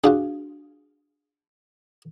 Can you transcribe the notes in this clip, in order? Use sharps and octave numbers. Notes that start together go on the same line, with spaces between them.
D4 F4 F#4 G#4